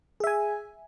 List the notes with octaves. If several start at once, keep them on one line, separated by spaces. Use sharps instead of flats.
G#4 E5 G#5